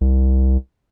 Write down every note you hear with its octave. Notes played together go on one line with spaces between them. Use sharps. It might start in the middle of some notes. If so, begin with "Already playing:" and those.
C2